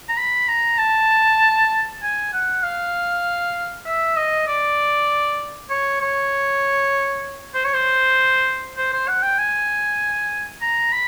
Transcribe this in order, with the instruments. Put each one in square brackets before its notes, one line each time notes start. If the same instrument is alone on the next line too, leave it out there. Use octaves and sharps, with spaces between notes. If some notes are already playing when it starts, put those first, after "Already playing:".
[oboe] A#5
B5
A#5
A5
G#5
F#5
F5
E5
D#5
D5
C#5
C#5
C5
C#5
C5
C5
C5
F#5
G5
G#5
A#5
B5